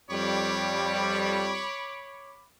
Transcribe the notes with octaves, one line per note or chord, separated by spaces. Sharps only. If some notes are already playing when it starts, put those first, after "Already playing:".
F2 G3 C#5 B5 D6